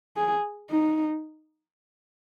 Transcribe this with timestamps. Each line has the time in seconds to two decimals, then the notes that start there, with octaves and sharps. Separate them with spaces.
0.17 G#4
0.70 D#4